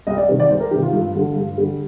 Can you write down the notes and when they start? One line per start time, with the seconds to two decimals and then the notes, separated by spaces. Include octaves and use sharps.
0.07 C2 D#5
0.17 D5
0.29 C3 D#3
0.40 D5
0.50 C2 C5
0.60 A#4
0.71 C3 D#3 G4
0.82 F4
0.93 G2
1.15 D3 G3
1.36 G2
1.58 D3 G3